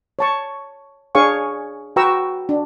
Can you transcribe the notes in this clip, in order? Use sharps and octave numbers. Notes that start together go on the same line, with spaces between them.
C#5 A5 C#6
D4 G#4 C#5 F5 G#5 C#6
F#4 B4 G5 A#5 C#6 E6
D4